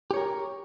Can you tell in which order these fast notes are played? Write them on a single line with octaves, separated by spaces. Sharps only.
G4 C#5 A#4